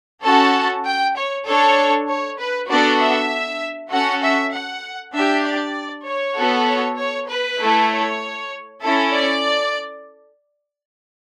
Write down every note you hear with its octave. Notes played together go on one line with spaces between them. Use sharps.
C#4 F#4 A4 A5
G5
C#5
D4 A4 C#5
C#5
B4
B3 D4 F#4 A4 D5
E5
C#4 F#4 A4 F#5
E5
F#5
D4 G4 E5
D5
C#5
B3 F#4 A4
C#5
C#5
B4
A3 E4 A4
C#5
C#4 E4 A4
D5